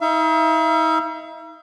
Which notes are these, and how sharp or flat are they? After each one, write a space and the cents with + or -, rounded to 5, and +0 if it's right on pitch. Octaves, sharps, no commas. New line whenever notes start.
D#4 +40 E5 +45